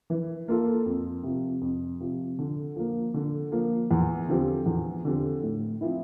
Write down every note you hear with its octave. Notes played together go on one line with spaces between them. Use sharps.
E3
A#3 F4 A4
F2
C3 F3
F2
C3 F3
D3
F3 A#3
D3
F3 A#3
E2
D3 F3 C4 G4
E2
D3 F3 C4 G4
A2
F3 C4 E4